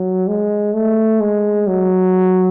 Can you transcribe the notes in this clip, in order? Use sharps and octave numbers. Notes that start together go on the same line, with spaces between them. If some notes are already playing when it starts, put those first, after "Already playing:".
Already playing: F#3
G#3
A3
G#3
F#3